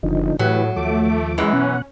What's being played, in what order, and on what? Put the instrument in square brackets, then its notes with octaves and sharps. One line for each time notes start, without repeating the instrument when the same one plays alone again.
[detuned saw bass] F#1 [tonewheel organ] D3 F3 D#4
[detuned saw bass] A2 [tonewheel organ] E3 G4 B4 [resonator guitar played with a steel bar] F#3
[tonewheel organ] D#2 F3 D6 [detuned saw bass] A3
[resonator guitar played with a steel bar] F#2 E3 [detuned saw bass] G#3
[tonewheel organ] B2 F#5 [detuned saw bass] C#4